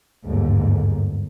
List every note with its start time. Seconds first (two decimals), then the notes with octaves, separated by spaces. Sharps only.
0.25 G1 D#2 G#2